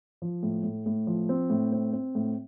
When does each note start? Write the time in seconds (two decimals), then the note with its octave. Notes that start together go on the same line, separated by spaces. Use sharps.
0.22 F3
0.43 A2
0.64 A2
0.86 A2
1.07 F3
1.29 C4
1.50 A2
1.72 C4
1.93 C4
2.15 A2